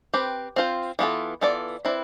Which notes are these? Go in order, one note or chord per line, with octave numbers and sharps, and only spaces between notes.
C4 G4 B4
C4 F4 C5
E3 B3 F4 A4
E3 B3 F4 A4 D5
C4 E4 B4 D5